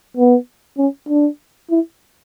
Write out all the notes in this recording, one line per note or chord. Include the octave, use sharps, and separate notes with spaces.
B3
C#4
D4
E4